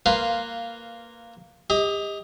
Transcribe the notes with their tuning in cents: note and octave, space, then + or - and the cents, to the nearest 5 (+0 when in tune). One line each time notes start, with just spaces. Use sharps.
A#3 -10 F4 +0 B4 +0
G4 +40 D#5 +20